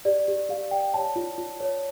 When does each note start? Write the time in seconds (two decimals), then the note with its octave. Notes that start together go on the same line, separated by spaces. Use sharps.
0.05 G4 D5
0.28 G4
0.49 G4 F5
0.71 D5 G5
0.94 C#5 A5
1.16 F4
1.38 F4
1.60 C#5